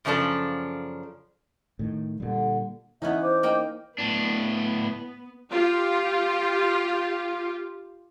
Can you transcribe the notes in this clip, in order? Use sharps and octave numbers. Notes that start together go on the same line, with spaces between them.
F#2 C#3 F3 D4 A4
A2 D#3
A#2 D3 G3
E3 B3 C#4 D#4 E5
C5 D6
A#3 D#4 G5
A2 B3 D4
F4 G4